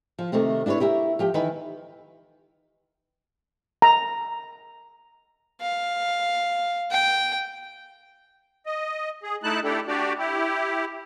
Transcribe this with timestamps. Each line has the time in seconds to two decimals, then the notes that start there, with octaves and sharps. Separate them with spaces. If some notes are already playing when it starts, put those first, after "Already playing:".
0.19 F3
0.32 C3 D#3 A3 C4
0.66 D4 E4 A4 B4 C#5
0.80 E4 G4 A#4 E5
1.19 F3 G4 G5
1.34 D#3 E3 D#4 E4 B4
3.82 A#5
5.62 F5
6.92 G5
8.66 D#5
9.23 G#4
9.44 A3 D#4 E4 A5 F#6
9.64 A3 D4 E4 G4 A4
9.88 D4 F#4 G4 D5
10.18 E4 G4